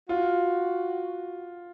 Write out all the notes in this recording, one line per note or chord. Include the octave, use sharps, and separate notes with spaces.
F4 F#4